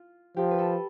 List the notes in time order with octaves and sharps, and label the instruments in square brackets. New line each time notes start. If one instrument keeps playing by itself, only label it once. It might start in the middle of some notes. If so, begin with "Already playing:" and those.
Already playing: [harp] F4
[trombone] F3 [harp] G4
[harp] B4
A4